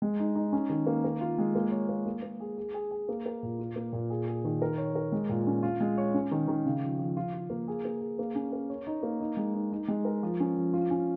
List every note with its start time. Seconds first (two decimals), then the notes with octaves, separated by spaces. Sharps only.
0.02 G#3
0.20 D#4
0.35 D#4
0.53 C#4
0.70 D#3
0.87 A#3
1.04 A#4
1.21 F4
1.38 G#3
1.55 A#3
1.71 C#5
1.89 A#3
2.06 A#3
2.23 A#3
2.40 G#4
2.57 G#4
2.74 G#4
2.91 G#4
3.09 A#3
3.26 A#4
3.43 A#2
3.59 F4
3.76 A#3
3.93 A#2
4.10 G#4
4.27 G#4
4.44 D#3
4.62 A#4
4.78 C#5
4.95 A#4
5.12 G#3
5.29 A#2
5.47 C#4
5.63 F4
5.80 G#3
5.98 C#5
6.14 C#4
6.31 D#3
6.48 D#3
6.66 C#3
6.82 F3
6.99 F3
7.17 F4
7.34 F4
7.50 A#3
7.68 G#4
7.85 A#3
8.01 G#4
8.19 A#3
8.35 C#4
8.53 A#4
8.70 C#5
8.87 D#4
9.03 A#3
9.20 D#4
9.37 G#3
9.55 D#4
9.72 D#4
9.88 G#3
10.05 A#4
10.23 F3
10.40 C#4
10.57 F3
10.73 F4
10.90 C#4